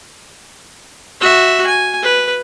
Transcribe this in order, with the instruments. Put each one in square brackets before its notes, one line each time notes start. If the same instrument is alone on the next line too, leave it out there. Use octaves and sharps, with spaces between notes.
[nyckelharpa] F#4 E5
G#5
B4